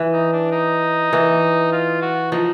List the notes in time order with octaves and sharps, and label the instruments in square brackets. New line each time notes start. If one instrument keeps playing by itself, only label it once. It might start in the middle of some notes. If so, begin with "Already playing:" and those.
Already playing: [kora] E3
[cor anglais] D#4
D4
D#4
[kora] E3
[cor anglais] F4
F#4
[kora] F3 [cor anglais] D#4